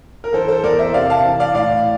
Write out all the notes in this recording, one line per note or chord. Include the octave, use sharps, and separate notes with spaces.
A#4
E3 A4 C5
A4 C5
E2 A#4 D5
C5 E5
C3 D5 F5
F5 A5
E3
D5 F5
A2 D5 F5